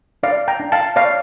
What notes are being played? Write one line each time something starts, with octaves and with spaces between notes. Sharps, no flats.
D4 D5 F5
G5 A#5
D4
F5 A5
C#5 D5 F5